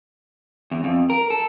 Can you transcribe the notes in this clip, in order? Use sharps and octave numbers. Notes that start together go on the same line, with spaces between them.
E2
F2
A#4
A4